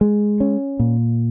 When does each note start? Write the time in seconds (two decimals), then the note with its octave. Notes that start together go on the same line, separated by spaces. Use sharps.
0.01 G#3
0.40 C#4
0.79 A#2